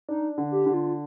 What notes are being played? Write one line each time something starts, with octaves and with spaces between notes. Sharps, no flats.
D4 D#4
D3
G4
D3
F4